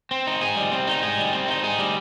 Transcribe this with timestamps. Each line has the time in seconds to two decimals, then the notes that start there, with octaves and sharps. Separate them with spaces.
0.11 C4
0.27 D#4
0.41 G#4
0.56 G3
0.72 C4
0.87 D#4
1.03 G#4
1.18 G3
1.33 C4
1.48 D#4
1.64 G#4
1.79 G3